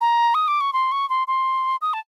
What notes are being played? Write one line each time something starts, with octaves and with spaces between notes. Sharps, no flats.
A#5
D#6
D6
C#6
C6
C#6
C6
C6
D#6
A5